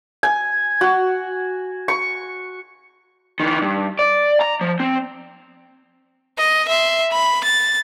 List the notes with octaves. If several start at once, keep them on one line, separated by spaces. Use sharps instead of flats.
G#5
F#4
C#6
D#3 E3
G2
D5
A#5
F3
C4
D#5
E5 C6
B5
A6